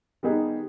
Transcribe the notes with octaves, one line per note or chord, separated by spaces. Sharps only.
D#3 G3 B3 D#4 G#4